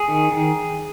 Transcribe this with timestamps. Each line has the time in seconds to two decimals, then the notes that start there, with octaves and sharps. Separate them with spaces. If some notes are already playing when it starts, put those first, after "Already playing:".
Already playing: G#4
0.08 D#3
0.32 D#3